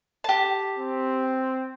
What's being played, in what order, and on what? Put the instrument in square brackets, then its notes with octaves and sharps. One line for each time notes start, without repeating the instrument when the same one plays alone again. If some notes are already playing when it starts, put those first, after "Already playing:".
[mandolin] G4 A5
[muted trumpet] C4